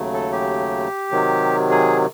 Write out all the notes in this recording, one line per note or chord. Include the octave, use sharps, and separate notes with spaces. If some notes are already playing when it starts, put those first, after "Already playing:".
Already playing: D#2 C#3 F#3 A3
A4
G4
C3 D#3 F#3
G#4